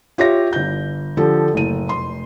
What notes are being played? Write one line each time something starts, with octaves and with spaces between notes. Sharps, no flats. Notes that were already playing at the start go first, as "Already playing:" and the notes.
F4 G4 C#5 E5 A#6
G1 G6
D3 F3 G4 A4
F#1 A2 D#7
F1 C6